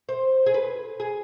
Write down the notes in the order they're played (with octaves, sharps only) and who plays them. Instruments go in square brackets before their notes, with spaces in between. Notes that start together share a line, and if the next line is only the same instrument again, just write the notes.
[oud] C5
G#4
B4
G#4